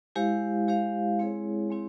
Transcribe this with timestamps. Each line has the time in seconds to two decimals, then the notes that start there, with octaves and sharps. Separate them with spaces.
0.16 G#3 E4 G4 C5 F5
0.68 G#3 E4 G4 C5 F5
1.19 G#3 C4 E4 G#4 C#5
1.71 G#3 C4 E4